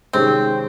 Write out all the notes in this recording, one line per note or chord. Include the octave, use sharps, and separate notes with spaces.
C3 D#3 G#3 C4 C#4